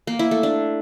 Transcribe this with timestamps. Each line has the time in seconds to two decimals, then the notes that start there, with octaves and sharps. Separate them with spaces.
0.07 A#3
0.19 E4
0.31 A3
0.43 D4